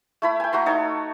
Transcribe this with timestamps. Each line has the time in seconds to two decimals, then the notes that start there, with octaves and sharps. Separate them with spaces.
0.22 A3 E4 B5
0.40 G5 G#5
0.52 A3 F#4 A#5 C6
0.66 D#4 A4 C#5